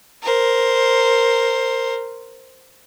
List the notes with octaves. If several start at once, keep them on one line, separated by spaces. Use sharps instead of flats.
A#4 C5